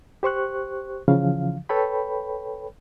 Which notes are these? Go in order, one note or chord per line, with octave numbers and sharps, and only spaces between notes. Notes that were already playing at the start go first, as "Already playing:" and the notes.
G4 C5 C#6 F#6
C#3 E3 F3 F5
A4 B4 C#5 G5 B5